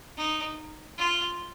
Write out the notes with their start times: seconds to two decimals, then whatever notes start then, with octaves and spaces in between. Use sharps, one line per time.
0.17 D#4
0.98 F4